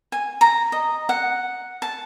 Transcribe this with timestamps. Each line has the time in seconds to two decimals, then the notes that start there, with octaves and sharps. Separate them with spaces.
0.12 G#5
0.41 A#5
0.72 D#5
1.09 F#5
1.82 A5